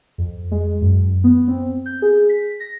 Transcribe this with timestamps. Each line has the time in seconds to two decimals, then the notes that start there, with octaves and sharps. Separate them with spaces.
0.18 F2
0.51 G#3
0.82 F#2
1.24 B3
1.48 C4
1.86 G6
2.02 G#4
2.29 B6
2.60 A#6